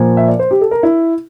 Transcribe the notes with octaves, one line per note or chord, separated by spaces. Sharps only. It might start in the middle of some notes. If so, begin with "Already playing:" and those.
Already playing: A#2 F3
E5
D5
C5
G4
A4
A#4
E4